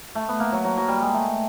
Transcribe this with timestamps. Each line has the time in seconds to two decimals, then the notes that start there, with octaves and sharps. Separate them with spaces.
0.15 A3
0.29 B3
0.40 A#3
0.52 F#3
0.64 F#3
0.78 F#3
0.88 G3
1.02 G#3
1.14 A3